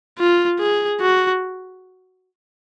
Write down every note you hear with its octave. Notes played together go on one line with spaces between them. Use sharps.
F4
G#4
F#4